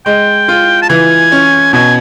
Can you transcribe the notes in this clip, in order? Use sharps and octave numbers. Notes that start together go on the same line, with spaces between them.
G#3 G5
F4
A5
E3 G#5
C#4
B2 G#5